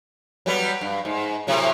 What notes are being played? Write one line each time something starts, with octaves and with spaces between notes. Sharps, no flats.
F#3 G3 B3
G2
G#2
A2 C3 F#3